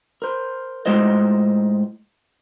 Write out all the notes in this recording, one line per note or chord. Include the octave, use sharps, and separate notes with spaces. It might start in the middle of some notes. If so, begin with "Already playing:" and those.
A#4 C5
A2 G#3 F4 C5 D#5